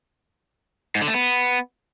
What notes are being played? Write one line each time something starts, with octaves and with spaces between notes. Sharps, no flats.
G#2
D3
A3
B3